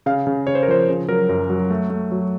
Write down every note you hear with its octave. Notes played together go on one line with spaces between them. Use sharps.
C#3 F5
C#3
C#3 C#5
C5
A#4
F3 C5
C#3
F#3 A#4
F#2 A#4
F#3
A3
A3
F#3